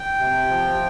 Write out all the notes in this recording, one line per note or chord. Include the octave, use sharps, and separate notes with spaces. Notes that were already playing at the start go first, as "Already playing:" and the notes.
Already playing: G5
C3
F3